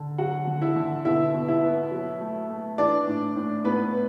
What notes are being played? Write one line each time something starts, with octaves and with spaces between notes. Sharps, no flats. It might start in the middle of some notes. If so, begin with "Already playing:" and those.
Already playing: D3
F#3 F#4 F#5
D3
E4 E5
D3
B2 E4 E5
B2
E4 E5
B3
F#3
A3
A3
E3 D4 D5
A2
A2
A2 B3 B4